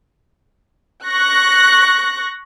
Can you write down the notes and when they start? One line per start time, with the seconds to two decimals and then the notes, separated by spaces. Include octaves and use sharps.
1.07 C#6 F#6 A#6